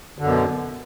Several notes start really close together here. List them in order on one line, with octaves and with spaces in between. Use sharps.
D3 F#2 B2